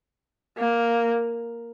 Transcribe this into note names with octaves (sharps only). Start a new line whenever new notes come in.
A#3